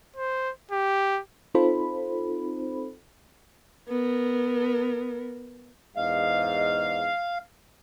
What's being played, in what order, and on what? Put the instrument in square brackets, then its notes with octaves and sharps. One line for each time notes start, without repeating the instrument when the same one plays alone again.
[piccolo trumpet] C5
G4
[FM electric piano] C4 D#4 F4 A4 C5 B5
[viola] B3 A#4
[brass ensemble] E2 G#2 D#5 [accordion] F5